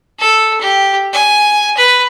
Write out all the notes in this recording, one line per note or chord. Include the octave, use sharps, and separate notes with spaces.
A4
G4
G#5
B4